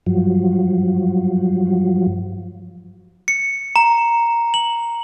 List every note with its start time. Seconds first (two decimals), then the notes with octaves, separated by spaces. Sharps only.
0.06 G2 F3 F#3
3.28 C#7
3.76 A#5
4.54 F#7